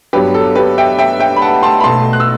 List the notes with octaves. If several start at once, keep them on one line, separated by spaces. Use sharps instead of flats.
G2 F#3 B3 G4 B4
A4
G4 B4
E5 G5
E5 G5
E5 G5
B5
F#5 A5
A5 C6
B5
B1 B2 A3 A5 C6
F#6
E6